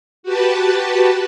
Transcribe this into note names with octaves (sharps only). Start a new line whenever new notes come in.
F#4 G4 B4 A5